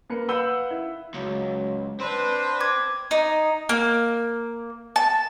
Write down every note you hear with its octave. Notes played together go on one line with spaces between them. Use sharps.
A#3 B4 C#7
B4 F5 F#5 E6 G6 G7
E4
C#2 F#3
C4 D4 B4 C5
D6 G#6
D#4
A#3
A5